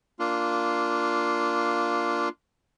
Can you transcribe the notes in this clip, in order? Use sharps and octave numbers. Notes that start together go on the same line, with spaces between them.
A#3 D4 F4